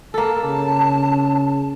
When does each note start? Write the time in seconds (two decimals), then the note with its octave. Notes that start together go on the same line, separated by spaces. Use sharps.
0.14 A#3 A4 A5
0.44 C#3